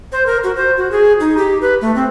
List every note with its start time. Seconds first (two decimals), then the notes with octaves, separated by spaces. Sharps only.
0.12 C5
0.26 A#4
0.44 F#4
0.56 C5
0.77 F#4
0.92 G#4
1.20 D#4
1.38 G4
1.62 B4
1.81 A3
1.95 C4